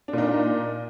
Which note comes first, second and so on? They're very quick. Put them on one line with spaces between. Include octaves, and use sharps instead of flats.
D4 A#2 D#4